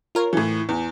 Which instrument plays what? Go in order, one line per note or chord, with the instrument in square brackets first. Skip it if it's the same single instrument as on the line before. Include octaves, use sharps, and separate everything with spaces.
[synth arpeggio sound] F4 A#4 C#5
[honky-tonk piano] A2 E3
E2